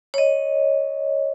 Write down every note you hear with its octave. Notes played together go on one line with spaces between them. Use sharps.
C#5 D#5